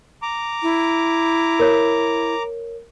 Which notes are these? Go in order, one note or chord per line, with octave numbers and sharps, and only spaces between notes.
A#5 D6
E4
A#4 C#5